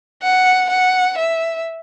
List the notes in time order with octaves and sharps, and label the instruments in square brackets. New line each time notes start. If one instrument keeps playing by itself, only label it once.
[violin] F#5
F#5
E5